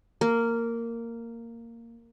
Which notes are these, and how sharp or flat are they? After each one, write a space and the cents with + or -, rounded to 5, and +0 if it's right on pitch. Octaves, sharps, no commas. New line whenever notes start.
A#3 -10